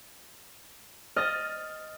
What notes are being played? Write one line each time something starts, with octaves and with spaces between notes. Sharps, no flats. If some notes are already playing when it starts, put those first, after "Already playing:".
D#5 F6 A6